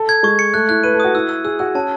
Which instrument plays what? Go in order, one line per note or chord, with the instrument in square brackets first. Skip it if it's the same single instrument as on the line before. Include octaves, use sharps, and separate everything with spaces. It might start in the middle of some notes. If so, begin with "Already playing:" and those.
Already playing: [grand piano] A4
[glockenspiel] G#6
[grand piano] G#3 [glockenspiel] C#6
[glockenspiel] C#7
[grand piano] A3 [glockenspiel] F#6
[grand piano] E4 [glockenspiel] F#6
[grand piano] B4 [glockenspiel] D#7
[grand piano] A4
[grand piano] F#4 [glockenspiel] D#6
[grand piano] E4 [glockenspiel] E6
[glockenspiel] E6
[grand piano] G#4 [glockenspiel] E6
[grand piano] F#4 [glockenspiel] E6
[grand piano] C#4 [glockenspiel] A5